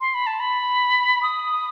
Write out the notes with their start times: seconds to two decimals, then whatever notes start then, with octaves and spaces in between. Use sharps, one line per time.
0.01 C6
0.14 B5
0.27 A5
0.40 B5
1.23 D#6